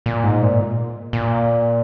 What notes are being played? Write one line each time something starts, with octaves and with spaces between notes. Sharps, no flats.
A#2
G#2
A#2
A#2